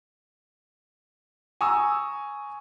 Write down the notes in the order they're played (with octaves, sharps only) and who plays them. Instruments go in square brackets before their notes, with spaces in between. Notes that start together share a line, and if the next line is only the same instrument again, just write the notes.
[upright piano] G#5 A#5 C#6 D#6 E6